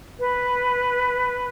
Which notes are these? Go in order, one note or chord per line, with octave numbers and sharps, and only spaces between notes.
B4